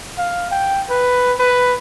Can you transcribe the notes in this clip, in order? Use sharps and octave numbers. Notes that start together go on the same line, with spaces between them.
F5
G5
B4
B4